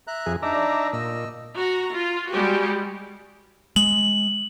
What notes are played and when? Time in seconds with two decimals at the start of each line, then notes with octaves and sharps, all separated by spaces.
0.07 E5 A#5 F#6
0.26 F2 G#4
0.42 D4 D#4 D5 E5 A#5
0.93 A#2 D#5 E6
1.56 F#4 A#5
1.94 F4
2.30 G3 G#3 F#4 G4
3.76 G#3 F#7